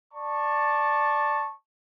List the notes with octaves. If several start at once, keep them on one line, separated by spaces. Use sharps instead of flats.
D5 A5 C#6